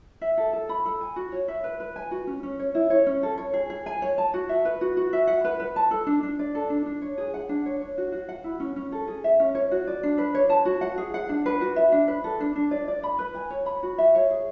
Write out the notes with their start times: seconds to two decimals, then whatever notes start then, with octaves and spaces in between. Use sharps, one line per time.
0.21 E5
0.37 A4
0.53 A4
0.69 B5
0.85 A4
1.01 G#5
1.16 F#4
1.32 C#5
1.48 E5
1.64 B4
1.80 B4
1.96 G#5
2.11 F#4
2.27 C#4
2.43 C#4
2.59 C#5
2.75 E4
2.90 C#5
3.07 C#4
3.23 A4
3.38 C#5
3.54 G#4
3.70 G#4
3.86 G#5
4.02 C#5
4.18 A5
4.34 F#4
4.49 E5
4.65 B4
4.81 F#4
4.97 F#4
5.13 E5
5.27 F#5
5.44 B4
5.60 B4
5.76 A5
5.91 A4
6.07 D4
6.23 D4
6.39 D5
6.55 A4
6.70 D4
6.86 D4
7.02 C#5
7.18 G#4
7.34 F#5
7.49 D4
7.66 C#5
7.81 C#5
7.98 F#4
8.12 F#4
8.29 F#5
8.44 E4
8.60 C#4
8.76 C#4
8.92 A4
9.08 G#4
9.24 E5
9.40 C#4
9.55 C#5
9.71 F#4
9.87 D5
10.03 D4
10.18 B4
10.35 C#5
10.50 A5
10.65 F#4
10.81 F#5
10.98 G#4
11.14 F#5
11.29 D4
11.46 B4
11.61 F#4
11.76 E5
11.92 D4
12.08 B4
12.24 A4
12.40 D4
12.56 D4
12.71 D5
12.88 D5
13.03 B5
13.19 B4
13.34 G#5
13.50 C#5
13.66 B5
13.83 F#4
13.98 E5
14.15 C#5
14.30 G#4